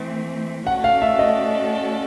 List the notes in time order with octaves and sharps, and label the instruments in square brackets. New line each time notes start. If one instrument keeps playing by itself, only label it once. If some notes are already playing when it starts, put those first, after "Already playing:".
Already playing: [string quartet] E3 A3 C4
[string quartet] A3 C#4 F#4 A4 D5 [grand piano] F#5
[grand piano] F5
E5
D#5